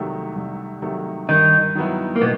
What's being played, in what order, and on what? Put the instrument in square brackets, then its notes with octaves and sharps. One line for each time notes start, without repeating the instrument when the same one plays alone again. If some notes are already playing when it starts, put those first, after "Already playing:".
Already playing: [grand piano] C2 C3 D#3 F#3 A3
C2
C3 D#3 F#3 A3
[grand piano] G2 [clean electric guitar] D#3 D#4
[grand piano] D#3 F#3 B3 E4
[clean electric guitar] A#3
B2 B3